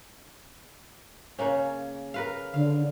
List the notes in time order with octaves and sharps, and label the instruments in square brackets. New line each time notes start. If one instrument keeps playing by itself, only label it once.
[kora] C#3 A#3 C#4
A#4 B4 F5
[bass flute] D3 [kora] F5